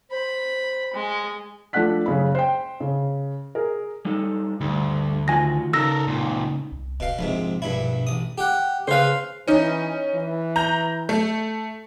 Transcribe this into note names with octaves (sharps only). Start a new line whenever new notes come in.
C5 B5
G#3
F3 A3 D4 F#5 F#6 B6
F#1 C#3 B5
C5 G5
C#3
G#4 A#4
G3 D#4 A4
D2 G2
D#3 F4 F#4 G#5 A#6
C#3 D#4 A4 A#4 E6 A#6
C#2 A#2
C2
D1 B2 F5
A#1 G#2 C3 F3
A#1 G2 B2 E4
A1 D#6
G4 F#5
C#3 B4 C5 F5
E3 C#4 D#4
E3
A#5 G6
A3